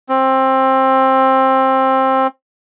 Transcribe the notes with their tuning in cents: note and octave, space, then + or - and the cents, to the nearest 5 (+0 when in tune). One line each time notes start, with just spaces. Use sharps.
C4 +15